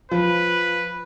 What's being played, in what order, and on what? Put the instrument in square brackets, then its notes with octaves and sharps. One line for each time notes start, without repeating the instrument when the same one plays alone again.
[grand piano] F3 [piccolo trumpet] B4